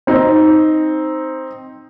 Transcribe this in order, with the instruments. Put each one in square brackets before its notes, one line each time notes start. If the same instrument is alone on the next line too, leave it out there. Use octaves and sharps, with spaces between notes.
[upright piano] C4 D#4